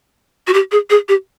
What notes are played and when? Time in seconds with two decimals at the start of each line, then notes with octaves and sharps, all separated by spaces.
0.47 F#4
0.54 G4
0.72 G#4
0.90 G#4
1.09 G4